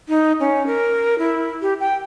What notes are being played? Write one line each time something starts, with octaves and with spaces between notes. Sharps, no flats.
D#4
C#4
A#4
E4
G4
G5